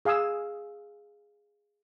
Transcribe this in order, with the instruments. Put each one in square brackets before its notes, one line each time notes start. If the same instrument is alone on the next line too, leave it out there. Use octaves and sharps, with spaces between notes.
[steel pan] G#4 F5 G#5 D#6 E6